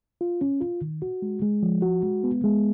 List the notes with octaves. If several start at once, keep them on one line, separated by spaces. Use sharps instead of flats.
F4
C#4
F4
D#3
F#4
G#3
G#3
F3
F#4
G#3
B3
G#3